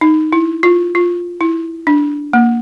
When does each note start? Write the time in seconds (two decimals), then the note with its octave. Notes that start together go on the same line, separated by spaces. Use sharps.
0.01 D#4
0.33 E4
0.63 F4
0.95 F4
1.41 E4
1.87 D4
2.33 A#3